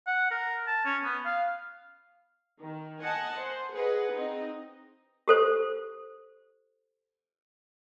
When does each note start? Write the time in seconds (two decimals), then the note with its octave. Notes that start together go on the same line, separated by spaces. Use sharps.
0.07 F#5
0.31 A#4
0.67 A5
0.85 C#4
1.04 B3
1.25 F5
2.60 D#3
3.03 D#5 F#5 G#5 A5
3.38 C5
3.73 G#4 B4 D#5 F#5
4.12 C4 D#4 D#5
5.28 G4 A4 C5